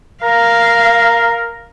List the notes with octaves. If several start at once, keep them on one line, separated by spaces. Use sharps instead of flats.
A#4 F5